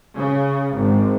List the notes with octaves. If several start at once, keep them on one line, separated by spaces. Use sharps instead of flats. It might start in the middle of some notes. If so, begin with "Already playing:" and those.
C#3
G#1